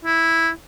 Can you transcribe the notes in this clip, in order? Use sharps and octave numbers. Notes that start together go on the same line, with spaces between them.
E4